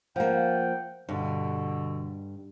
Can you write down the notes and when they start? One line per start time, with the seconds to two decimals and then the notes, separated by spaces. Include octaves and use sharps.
0.16 F3 A#3 F#5 G5
1.09 G2 B2 D3